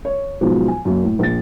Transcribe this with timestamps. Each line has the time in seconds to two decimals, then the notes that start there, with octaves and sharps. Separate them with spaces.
0.05 C#5
0.41 G#2 B2 F3 F#3
0.68 G#5
0.85 F#2 A#3
1.03 A2
1.19 A#1 A6